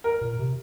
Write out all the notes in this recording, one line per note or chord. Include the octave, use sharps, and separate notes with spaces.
A#4
A#2
C3